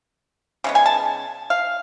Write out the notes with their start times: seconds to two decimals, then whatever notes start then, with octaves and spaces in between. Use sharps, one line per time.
0.64 C#3 G#3 B3
0.75 G#5
0.86 A5
1.50 F5